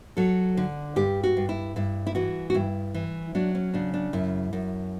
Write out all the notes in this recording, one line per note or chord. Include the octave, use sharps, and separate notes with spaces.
F#3 A4
D3
G2 G4
F#4
G2
E4
G2 E4
E4
E3 F#4
F#4
G2 E4
E3
F#3 D4
C#4
C#3 D4
D4
F#2 E4
F#2